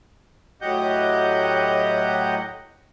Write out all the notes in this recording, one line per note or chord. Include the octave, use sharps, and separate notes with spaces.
A2 F#3 G4 D#5 F#5 G6